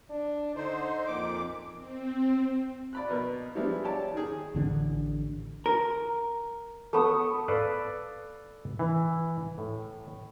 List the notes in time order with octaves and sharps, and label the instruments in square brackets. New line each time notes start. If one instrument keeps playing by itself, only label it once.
[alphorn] D4
[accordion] D3 C5 [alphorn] D#4
[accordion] F2 A#2 D6
[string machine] C4
[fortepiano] D5 B5 F#6
B2 B3 A#4 B4 D#5
F3 G3 G#3 B3 D4 E4
G4 C#5 D5 A5
D#3 G#4
[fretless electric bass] A1 D3 C#4 D4
[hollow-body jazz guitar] A#4
[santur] A3 B3 D#6
[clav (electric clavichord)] A4 B4 D5 F5
E3
A2